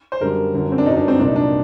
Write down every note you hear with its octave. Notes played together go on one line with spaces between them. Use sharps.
C5
F#2 D3 G3 A#4
G1 F#2 D3
C4
D4
G1 F#2 F#3 D#4
D4
C4
C2 A#2 F#3 D4
D#4
D4